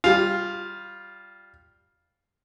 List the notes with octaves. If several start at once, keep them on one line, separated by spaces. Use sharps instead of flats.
G3 F4